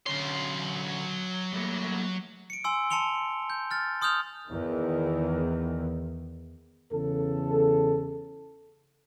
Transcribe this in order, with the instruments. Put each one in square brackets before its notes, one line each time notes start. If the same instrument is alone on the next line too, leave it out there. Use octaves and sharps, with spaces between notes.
[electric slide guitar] D3 C#4 C#5 [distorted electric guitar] F#3 C6
[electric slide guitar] G3 A3 A#3
[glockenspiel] C#7 D7
G#5 C6 E6 D7
A5 C6 C#7 F7 G7
G6
F6 A6
C6 D#6 F6 G6 F7
[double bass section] E2 D#3
[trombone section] E2 C#3 A4